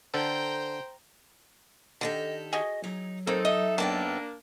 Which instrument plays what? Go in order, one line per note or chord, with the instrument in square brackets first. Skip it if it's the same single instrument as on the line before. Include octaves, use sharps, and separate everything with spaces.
[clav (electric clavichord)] D3 A4 [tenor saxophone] C5 [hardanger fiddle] G5 A#5
[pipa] D3 [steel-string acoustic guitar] D#3 G4 A4 [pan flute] D#5
[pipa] F#4 G#4 [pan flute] D#5
[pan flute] F#3 [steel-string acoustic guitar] D#4
[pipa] A#3 [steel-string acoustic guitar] C4 [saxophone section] D#4 A4
[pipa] D#5 [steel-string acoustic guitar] E5
[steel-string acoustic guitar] F#2 B3 G5 [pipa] D#3 A4 [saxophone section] A#3 D4